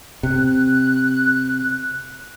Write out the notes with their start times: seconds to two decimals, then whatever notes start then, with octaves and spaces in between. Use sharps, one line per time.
0.23 C3 F#6